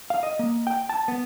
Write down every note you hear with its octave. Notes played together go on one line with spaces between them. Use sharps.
F5
D#5
A#3
G5
A5
B3